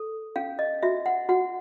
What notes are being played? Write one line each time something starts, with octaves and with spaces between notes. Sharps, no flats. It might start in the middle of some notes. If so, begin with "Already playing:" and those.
Already playing: A4
C#4 F5
D#5
F#4 E5
F#5
F#4 F#5